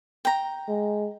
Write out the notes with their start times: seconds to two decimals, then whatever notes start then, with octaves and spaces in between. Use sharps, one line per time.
0.25 G5 A#5
0.68 G#3